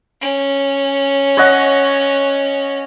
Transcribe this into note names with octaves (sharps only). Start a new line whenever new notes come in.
C#4
C#5 D#5 F#5